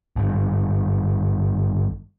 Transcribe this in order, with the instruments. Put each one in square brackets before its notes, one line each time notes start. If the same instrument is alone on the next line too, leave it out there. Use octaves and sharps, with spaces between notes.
[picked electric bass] G#1 G2